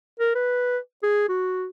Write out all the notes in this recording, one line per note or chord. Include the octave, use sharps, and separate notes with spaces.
A#4
B4
G#4
F#4